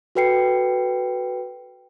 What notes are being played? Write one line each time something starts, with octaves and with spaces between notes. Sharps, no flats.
F#4 A4 B4 G5 C7 C#7